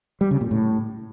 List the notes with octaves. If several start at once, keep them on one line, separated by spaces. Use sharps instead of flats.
G3
C#3
A#2
A2